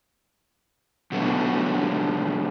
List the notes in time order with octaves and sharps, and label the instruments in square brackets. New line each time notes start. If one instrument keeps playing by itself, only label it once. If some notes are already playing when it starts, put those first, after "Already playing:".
[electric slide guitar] B2 D3 F#3 A3 B3